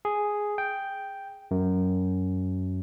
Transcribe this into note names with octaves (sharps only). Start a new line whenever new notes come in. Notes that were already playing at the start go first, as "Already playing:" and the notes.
G#4
G5
F#2